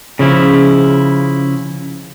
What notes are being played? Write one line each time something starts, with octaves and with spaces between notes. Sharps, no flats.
C#3 F3 E4